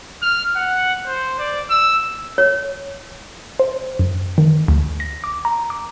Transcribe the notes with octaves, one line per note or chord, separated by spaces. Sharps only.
F6
F#5
C5
D5
E6
C#5
C5
F#2
D#3
D2
A#6
D6
A#5
D6